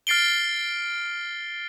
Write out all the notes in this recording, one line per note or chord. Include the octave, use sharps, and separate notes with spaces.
F6 A6 C7 D7 G7